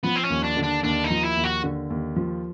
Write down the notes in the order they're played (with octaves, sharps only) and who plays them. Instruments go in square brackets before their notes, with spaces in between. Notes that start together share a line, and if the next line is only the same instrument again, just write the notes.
[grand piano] F3 [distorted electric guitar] B3
[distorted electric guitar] C4
C#4
[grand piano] D#2
[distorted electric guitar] D4
[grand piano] D3
[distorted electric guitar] D4
[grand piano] D#2 [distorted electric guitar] D4
[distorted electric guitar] D#4
[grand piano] F3
[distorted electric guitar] E4
[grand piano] D#2
[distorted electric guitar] F#4
[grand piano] D3
D#2
F3